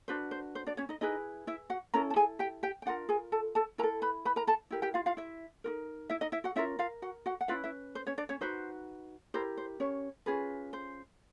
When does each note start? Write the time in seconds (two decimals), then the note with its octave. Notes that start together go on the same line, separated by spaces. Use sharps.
0.08 D4 F#4 B4 C5
0.31 C5
0.55 C5
0.67 D4 D5
0.77 C#4 C#5
0.89 D#4 D#5
1.01 D#4 E4 G#4 B4 D#5
1.47 E4 E5
1.70 F#4 F#5
1.94 C#4 E4 A4 A#4 A#5
2.10 A5
2.16 G#4 G#5
2.39 G4 G5
2.63 G4 G5
2.82 G5
2.86 D4 F4 A#4 F#5
3.09 G#4 G#5
3.32 A4 A5
3.55 A4 A5
3.78 E4 A#4 A#5
3.83 A4
4.02 B4 B5
4.25 B4 B5
4.36 A#4 A#5
4.47 A4 A5
4.71 E4 G4 A#4
4.82 G4 G5
4.94 F4 F5
5.06 F4 F5
5.17 E4 E5
5.64 D#4 F#4 A#4
6.10 E4 E5
6.21 D#4 D#5
6.32 E4 E5
6.44 F#4 F#5
6.56 C#4 E4 F4 A#4 E5
6.79 F4 F5
7.02 F#4 F#5
7.26 F#4 F#5
7.41 F#5
7.48 C#4 E4 F4 B4 F5
7.64 E4 E5
7.95 C5
8.07 C#4 C#5
8.18 D4 D5
8.29 C#4 C#5
8.41 D#4 F#4 B4 C5
9.34 E4 G4 A#4 C5
9.57 C5
9.80 C#4 C#5
10.26 C#4 F4 G#4 B4
10.73 C5